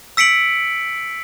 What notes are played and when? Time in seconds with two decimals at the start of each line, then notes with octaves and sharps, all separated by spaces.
0.17 E6 B6 C#7 D7 F#7